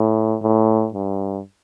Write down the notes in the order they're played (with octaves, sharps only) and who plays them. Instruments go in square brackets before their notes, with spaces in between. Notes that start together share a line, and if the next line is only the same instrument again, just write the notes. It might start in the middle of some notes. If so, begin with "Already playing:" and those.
Already playing: [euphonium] A2
A2
G2